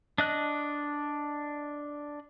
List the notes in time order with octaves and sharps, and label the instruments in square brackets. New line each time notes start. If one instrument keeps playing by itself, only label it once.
[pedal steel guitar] D4 D#5 F#6